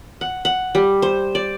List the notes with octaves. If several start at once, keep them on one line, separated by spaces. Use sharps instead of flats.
F#5
F#5
G3
C5
D5